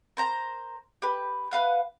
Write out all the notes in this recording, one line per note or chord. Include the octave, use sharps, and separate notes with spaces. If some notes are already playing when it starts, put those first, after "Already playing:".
A#4 C5 A#5
G4 B4
B4 F5 F#5